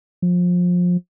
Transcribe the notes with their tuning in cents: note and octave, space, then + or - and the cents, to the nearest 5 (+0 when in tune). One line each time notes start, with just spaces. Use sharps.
F3 +25